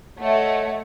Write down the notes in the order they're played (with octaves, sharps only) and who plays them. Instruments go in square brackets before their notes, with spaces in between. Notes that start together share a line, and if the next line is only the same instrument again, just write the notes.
[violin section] A3 [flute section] C#5 D#5 F#5